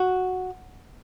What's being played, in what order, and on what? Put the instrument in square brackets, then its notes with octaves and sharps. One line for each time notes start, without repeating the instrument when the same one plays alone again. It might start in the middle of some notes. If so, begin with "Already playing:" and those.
Already playing: [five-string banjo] F#4